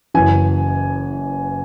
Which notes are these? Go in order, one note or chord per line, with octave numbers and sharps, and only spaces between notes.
F#1 F#2 E3 G#5